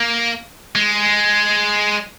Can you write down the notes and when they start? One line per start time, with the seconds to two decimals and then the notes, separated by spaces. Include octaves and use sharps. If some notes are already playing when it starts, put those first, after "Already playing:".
Already playing: A#3
0.75 G#3